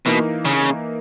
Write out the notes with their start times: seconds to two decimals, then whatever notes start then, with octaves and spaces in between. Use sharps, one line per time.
0.06 B2 E3 A#3 D#4 A#4
0.45 C#3